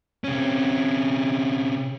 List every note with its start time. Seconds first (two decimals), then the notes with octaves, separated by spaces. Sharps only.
0.24 C3 C#4